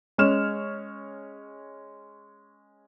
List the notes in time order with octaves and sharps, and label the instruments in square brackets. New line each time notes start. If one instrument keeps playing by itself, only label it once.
[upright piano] G#3 C#4 C#5 F6 E7